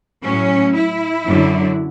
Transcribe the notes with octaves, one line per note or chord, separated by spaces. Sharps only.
A2 F#3 C#4
E4
F#2 D3 F#3